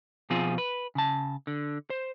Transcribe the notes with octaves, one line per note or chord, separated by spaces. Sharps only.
B2 F3 C4 F4 G#4
B4
C#3 A5
D3
C5